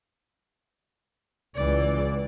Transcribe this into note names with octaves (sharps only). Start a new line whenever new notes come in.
C#2 E3 D5